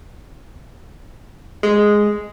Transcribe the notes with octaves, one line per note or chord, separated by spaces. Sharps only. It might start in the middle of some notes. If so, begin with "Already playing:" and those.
G#3